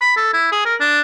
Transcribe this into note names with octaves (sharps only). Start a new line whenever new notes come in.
B5
A4
E4
G#4
A#4
D4